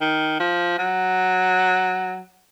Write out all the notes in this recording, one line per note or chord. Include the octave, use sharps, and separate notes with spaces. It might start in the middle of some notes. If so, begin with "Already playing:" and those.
D#3
F3
F#3